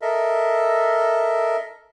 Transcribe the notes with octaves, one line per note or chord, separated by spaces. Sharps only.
A4 A#4 D#5 E5